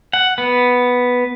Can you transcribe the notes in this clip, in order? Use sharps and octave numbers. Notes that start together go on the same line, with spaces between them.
F#5
B3